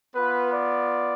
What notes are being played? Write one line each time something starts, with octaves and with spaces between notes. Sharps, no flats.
B3 F4 B4
D5